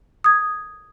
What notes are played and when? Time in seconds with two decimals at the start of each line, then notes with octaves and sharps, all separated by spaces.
0.24 D#6 G#6